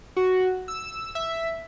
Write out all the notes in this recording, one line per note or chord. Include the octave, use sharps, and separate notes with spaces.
F#4
E6
E5